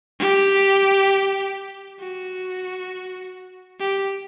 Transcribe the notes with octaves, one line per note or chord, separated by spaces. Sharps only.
G4
F#4
G4